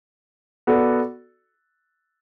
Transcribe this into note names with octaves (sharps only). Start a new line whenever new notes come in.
B3 F#4 A4 D5